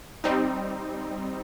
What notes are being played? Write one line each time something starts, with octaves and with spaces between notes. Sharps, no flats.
G3 C4 D#4